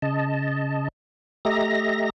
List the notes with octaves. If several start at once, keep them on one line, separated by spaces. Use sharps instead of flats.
C#3 D#5 A5
A3 G4 D#5 E5 A#5 A#6